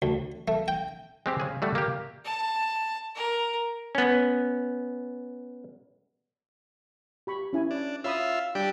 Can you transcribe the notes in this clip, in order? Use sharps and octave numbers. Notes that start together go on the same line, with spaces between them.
D2
A3
G5
G#3 C4 G4
C#3 G#4
G3 A3 F#4
A#3 G4
A5
A#4
B3 C#4
G4 B5 C#6
C#4 E4 G#5
D4
F4 C#5 E5 B5 D#6
G3 D4 G4 E6